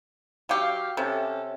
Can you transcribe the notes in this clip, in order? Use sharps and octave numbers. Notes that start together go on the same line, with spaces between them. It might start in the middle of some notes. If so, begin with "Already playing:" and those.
F#3 G4 F5
C3 C#4 A4